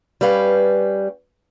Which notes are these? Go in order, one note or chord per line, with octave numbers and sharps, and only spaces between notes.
G3 C#4 B4 F5